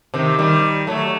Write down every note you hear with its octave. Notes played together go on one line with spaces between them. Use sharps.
C3 D#3
D#3 G3
F#3 A3